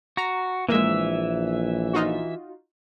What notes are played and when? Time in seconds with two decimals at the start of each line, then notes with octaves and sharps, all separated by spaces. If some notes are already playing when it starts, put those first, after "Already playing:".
0.17 F#4 A#5
0.69 A#1 E3 G#3 A#3 E5
1.93 D#4 F4 F#4